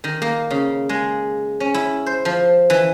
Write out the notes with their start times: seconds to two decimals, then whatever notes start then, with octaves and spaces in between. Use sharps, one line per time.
0.04 D#3
0.22 A#3
0.51 C#3
0.89 G#3
1.60 C#4
1.74 E4
2.06 C5
2.25 F3
2.70 E3